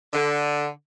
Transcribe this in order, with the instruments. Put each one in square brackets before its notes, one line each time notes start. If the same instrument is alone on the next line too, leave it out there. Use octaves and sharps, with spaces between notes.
[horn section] D3